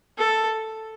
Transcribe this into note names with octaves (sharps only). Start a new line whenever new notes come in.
A4